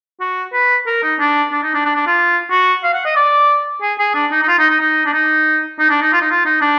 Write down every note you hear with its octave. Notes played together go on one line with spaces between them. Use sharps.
F#4
B4
A#4
D#4
D4
D4
D#4
D4
D4
D4
F4
F#4
F5
F#5
D#5
D5
G#4
G#4
D4
D#4
D#4
F4
D#4
D#4
D#4
D4
D#4
D#4
D4
D#4
F4
D#4
F4
D#4
D4